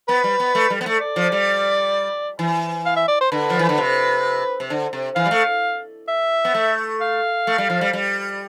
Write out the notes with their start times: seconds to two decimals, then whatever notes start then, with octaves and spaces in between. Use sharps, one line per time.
0.08 B3 B4
0.24 G3
0.40 B3
0.55 A3
0.70 G3
0.81 B3
0.86 A3
1.01 D5
1.16 F3
1.32 G3
2.39 E3
2.86 F5
2.96 E5
3.08 D5
3.21 C5
3.32 D3 B4
3.50 F3
3.59 E3
3.69 D3
3.78 C3
4.60 C3
4.70 D3
4.93 C3
5.16 E3 F5
5.26 G3
5.31 A3
6.08 E5
6.45 B3
6.54 A3
7.01 F5
7.47 A3
7.58 G3
7.70 F3
7.81 G3
7.93 G3